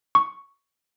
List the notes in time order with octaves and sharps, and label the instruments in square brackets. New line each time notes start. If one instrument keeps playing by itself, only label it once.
[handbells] C#6